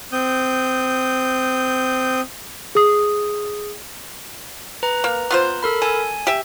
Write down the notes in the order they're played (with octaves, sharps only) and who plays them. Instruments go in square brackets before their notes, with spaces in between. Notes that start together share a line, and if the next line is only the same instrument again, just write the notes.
[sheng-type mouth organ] C4 D#6 G6
[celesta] G#4 D#6
[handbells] B4 A#5
[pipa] A#3
B3 F4 C5
[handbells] A4 A#4 B5
[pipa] A4 [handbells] G#5
[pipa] G4 E5